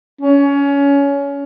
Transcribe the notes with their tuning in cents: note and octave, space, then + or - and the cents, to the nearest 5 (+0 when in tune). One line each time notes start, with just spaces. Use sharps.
C#4 +20